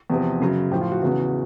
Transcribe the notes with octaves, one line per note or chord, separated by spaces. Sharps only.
E2 C3 F3
F#2 C#3 F#3
A2 F3 G4
F4
F#4
E2 C#3 E3 F#4